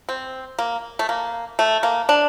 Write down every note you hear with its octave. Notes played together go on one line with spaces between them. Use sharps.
C4
A#3
A3
A#3
A3
A#3
D4